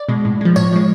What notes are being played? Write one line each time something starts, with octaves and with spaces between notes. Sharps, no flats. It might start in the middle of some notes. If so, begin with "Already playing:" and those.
Already playing: D5
B2 G#3
A2
F3 G#3
A2 C#5
F3 G#3